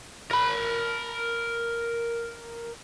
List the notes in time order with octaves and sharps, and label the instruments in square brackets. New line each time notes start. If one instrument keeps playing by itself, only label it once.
[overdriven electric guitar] A#4 B5